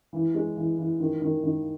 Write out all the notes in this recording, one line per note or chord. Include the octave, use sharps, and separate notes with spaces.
E3
G#3
E3
E3
D#3
D#3
D#3